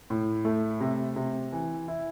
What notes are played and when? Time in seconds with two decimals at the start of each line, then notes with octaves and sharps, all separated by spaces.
0.10 A2
0.45 A3
0.81 C3
1.16 C3
1.52 E3
1.88 E4